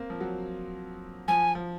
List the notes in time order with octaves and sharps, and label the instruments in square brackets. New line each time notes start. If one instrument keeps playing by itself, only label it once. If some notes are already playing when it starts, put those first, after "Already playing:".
Already playing: [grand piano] A#3 C4
F3
F#3
[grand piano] F3 [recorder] G#5
[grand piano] F3